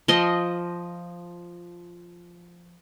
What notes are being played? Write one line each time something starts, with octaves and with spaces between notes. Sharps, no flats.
F3 D#5 C6